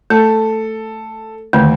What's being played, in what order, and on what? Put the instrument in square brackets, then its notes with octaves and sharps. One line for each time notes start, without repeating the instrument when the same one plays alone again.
[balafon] A3 [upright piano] A4
[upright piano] D#2 [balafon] D3 A3